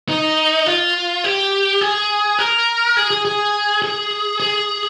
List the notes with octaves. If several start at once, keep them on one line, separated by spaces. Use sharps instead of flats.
D#4
F4
G4
G#4
A#4
G#4
G#4
G#4
G#4
G#4